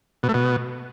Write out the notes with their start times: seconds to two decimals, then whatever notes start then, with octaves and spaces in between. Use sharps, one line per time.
0.23 B2
0.29 A3
0.34 B2